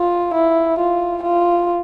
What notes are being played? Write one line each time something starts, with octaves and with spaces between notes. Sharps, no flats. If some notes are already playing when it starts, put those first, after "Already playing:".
Already playing: F4
E4
F4
F4